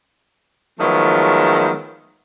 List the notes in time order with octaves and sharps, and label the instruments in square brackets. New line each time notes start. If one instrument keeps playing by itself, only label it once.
[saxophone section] D#3 F3 F#3 G#3 A3 B3